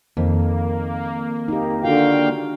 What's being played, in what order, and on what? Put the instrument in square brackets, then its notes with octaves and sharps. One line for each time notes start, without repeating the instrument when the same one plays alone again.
[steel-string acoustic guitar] F2 [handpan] D#3 [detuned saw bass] A#3
[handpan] D#4 G4
[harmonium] D3 F5 G5 [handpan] F4 F#4